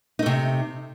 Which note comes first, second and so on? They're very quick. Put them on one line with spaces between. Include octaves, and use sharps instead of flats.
D#4 A3 C3